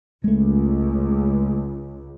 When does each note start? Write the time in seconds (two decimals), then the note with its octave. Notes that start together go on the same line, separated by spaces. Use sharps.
0.24 C#2 G#3 A3